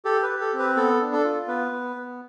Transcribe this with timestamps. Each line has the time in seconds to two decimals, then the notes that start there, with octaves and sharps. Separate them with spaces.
0.05 G4 A4
0.23 B4
0.29 G4
0.41 A4
0.53 C4
0.59 B4
0.76 B3 A4
1.01 D4
1.13 A4
1.24 F4
1.48 B3 B4
1.72 B3
1.96 B3